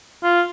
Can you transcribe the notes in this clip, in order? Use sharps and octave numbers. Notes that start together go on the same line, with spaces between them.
F4